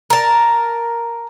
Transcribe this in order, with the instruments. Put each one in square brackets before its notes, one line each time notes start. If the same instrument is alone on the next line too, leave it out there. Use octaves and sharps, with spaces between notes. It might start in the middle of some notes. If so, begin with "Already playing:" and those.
[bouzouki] A#4 A5